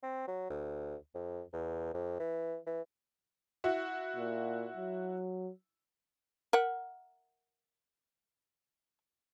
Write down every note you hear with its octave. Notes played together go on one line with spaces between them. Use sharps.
C4
F#3
D2
F2
E2
F2
E3
E3
E4 F#4
A#2
F#3
A#4 E5 F#5